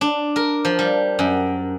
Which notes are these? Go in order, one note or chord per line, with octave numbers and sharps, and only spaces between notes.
D4
A#4
F3
G3
F#2